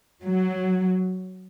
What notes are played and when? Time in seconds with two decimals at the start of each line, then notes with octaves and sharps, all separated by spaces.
0.23 F#3